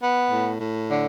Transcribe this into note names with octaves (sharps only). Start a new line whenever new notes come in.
B3
A2
A2
D3